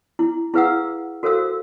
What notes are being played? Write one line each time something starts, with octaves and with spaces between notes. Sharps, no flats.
E4
E4 G#4 B4 F5 F#5 E6
F#4 A4 A#4 C5 F5 E6